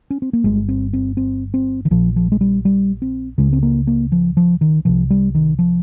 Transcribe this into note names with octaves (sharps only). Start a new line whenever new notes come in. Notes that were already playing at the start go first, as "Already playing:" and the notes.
C#4
C4
A#3
G1 G2 G#3
C4
C4
C4
C4
D#3
A#1 A#2 F3
F3
G#3
G3
G3
C4
C#2 C#3 G#3
C4
A#3
A#3
F3
F3
D#3
C2 C3 F3
G3
D#3
F3